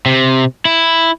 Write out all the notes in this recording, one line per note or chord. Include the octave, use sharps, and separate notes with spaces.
C3
E4